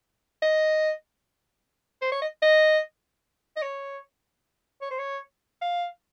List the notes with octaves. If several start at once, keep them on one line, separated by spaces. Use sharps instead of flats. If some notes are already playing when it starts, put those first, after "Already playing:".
D#5
C5
C#5
D#5
D#5
D#5
C#5
C#5
C5
C#5
F5